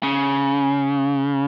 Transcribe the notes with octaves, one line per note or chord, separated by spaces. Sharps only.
C#3